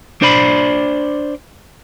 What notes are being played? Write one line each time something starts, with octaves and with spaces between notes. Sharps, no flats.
D4 C5 D5 B5